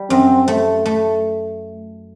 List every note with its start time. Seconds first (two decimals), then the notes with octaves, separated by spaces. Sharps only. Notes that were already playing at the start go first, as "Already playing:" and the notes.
Already playing: G3
0.10 F#2 C4
0.48 A3
0.86 A3